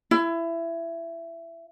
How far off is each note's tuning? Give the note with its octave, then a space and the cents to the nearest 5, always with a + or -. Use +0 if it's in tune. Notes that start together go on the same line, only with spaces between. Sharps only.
E4 +20